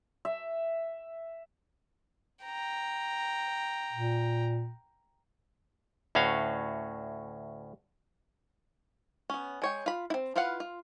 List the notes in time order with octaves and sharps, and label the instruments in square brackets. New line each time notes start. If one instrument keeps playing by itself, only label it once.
[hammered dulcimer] E5
[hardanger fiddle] G5 A#5
[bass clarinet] A#2
[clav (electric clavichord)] D2 A2 C#4 F#4 F5
[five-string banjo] B3 C#4
G#3 C#5 G5
F4 B5
C4 E4
E4 F4 B4 F5 F#5
F4